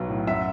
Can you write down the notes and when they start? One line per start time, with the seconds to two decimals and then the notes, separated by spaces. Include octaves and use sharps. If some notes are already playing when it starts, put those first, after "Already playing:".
Already playing: B1 F#3 B3
0.09 A2
0.27 F#2 E5 F#5